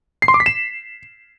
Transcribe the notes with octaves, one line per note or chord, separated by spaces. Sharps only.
C7
C6
D6
B6
E7